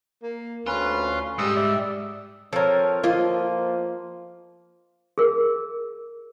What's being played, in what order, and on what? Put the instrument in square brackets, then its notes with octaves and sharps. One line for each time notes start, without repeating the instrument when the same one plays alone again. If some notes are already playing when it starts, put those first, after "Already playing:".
[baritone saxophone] A#3
[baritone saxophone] D2 [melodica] C#4 B4 [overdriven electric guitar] F4
[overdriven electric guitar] G#2 [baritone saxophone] G3 [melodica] D#6 E6
[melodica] D5 E5
[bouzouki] F3 C#5 [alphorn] C4 [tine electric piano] A4 A#4
[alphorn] F3 [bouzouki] A#3 D#5 [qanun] F4
[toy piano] G#4 A#4